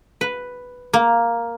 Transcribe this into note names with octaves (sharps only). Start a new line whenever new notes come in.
B4
A#3